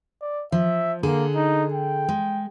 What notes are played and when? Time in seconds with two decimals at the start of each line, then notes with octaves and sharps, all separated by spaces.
0.21 D5
0.52 F3 E5
1.03 D3 A#3 G#4 A4
1.35 D#4
1.73 G5
2.09 G#3